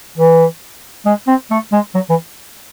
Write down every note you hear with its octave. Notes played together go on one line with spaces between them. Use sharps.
E3
G#3
C4
A3
G#3
F#3
E3